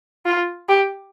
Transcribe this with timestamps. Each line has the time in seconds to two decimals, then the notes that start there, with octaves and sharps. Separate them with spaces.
0.25 F4
0.69 G4